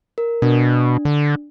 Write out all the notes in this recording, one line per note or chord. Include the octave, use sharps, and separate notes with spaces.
A#4
B2 D4
D3